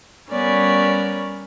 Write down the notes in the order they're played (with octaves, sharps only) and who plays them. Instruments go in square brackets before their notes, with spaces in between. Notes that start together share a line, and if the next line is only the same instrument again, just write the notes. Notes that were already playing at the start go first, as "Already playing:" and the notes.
[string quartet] G3 B3 C#4 A#4 C#5 D5